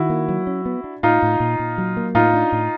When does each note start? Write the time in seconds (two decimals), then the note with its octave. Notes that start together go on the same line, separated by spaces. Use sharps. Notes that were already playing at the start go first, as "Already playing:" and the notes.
Already playing: D#3 E4 F#4
0.10 A#3
0.29 F#3
0.47 C#4
0.66 B3
0.84 D4
1.03 A2 D#4 F4
1.22 A2
1.40 A#2
1.59 A#2
1.78 F#3
1.97 A#3
2.15 A2 D#4 F4
2.34 D4
2.52 A2